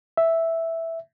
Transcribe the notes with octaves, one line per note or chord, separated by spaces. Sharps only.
E5